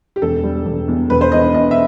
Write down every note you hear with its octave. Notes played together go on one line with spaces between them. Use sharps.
G4
E1 A4
G3
E1
E2
E1 B4
C5
E2 D#5
E2 D#5
E5